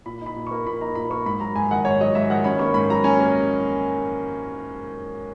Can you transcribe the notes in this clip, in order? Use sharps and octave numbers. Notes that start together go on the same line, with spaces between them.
A#2 B5
D#4 B5
A#2
A#3 C#6
A#2 B5
D#4 A#5
A#2 B5
A#3 C#6
G#2 B5
F#3 A#5
G#2 G#5
D#3 F#5
G#2 C#5
F#3 D#5
G#2 E5
D#3 F#5
C#4 B5
A#3 C#6
G#2 B5
F#3 A#5
C#4 G#5
A#3